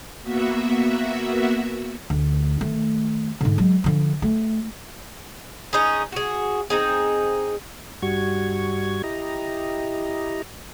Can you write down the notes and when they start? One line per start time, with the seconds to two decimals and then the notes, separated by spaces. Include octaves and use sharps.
0.22 A#3 B3 F#4 E5
2.10 D2
2.61 D#3 A3
3.41 G#2 D3
3.58 F#3 G#3
3.84 D3 F3
4.22 A3
5.73 C#4 D#4 G#4
6.12 F#4 G#4
6.70 C4 D#4 G#4
8.02 G2 G3 F#4 C#6 G#6
9.03 E4 G4 D#5 A#5